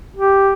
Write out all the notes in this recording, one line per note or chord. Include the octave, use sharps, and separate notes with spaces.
G4